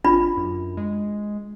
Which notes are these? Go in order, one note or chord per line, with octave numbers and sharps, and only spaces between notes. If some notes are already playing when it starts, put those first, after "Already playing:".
G1 D4 F4 B5
F#2
G#3